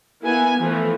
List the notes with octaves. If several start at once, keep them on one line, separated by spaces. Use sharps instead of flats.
A#3 B3 E4 G#5
E3 F3 A3